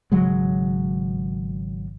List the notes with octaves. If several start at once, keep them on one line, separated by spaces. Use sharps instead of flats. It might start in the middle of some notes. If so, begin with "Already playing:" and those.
G#1 C#3 F#3 G#3